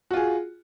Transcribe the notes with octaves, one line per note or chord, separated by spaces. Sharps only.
F4 F#4 G#4